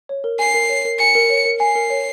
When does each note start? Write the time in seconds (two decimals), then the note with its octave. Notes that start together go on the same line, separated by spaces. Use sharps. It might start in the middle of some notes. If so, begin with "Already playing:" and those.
0.09 C#5
0.24 A#4
0.39 G#5 C7
0.54 A#4
0.69 C#5
0.85 A#4
0.99 G#5 C#7
1.15 A#4
1.30 C#5
1.45 A#4
1.60 G#5 C7
1.76 A#4
1.90 C#5